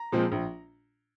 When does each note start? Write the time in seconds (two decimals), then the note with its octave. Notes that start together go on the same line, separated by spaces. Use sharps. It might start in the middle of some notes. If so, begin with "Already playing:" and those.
Already playing: A#5
0.12 A#2 F3 G#3 C4
0.32 A#1